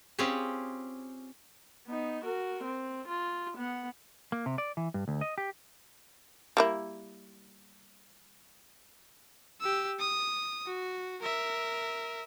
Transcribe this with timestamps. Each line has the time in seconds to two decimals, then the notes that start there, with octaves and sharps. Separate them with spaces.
0.19 C4 C#4 F4 G4 G#4
1.87 B3 D#4
2.25 F#4 A#4
2.64 C4
3.08 F4
3.57 B3 F#5
4.32 A#3
4.46 C3
4.58 D5
4.77 E3
4.94 G2
5.08 D2
5.21 D#5
5.38 G4
6.57 G3 A#3 E4
9.61 G4 E6
9.99 D#6
10.66 F#4
11.22 A#4 E5